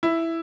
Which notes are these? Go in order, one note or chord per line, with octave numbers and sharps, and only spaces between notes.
E4